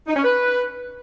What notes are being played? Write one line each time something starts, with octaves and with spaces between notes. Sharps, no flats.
D#4
C#4
B4